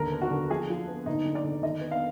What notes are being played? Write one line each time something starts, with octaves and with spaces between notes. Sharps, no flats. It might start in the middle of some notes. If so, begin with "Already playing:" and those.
Already playing: D#2 D3 A#4
B3
F#4
D3
F3 G#4
F3
B3
D3 D#4
D3
D5
D3
D#3 D#5
B3
F5